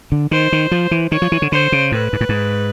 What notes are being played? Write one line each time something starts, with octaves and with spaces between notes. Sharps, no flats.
D3
D#3 C5
D#3
F3
E3
D#3 C#5
F3
E3
D3
D3 C5
C#3
A2 B4
G#2
A2
G#2